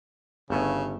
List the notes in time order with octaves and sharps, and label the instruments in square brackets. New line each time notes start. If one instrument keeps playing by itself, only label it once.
[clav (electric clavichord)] G1 A3 G#5 [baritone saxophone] C#3